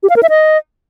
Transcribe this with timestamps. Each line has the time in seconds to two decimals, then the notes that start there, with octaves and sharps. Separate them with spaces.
0.03 G4
0.10 F5
0.16 A#4
0.23 E5
0.30 D#5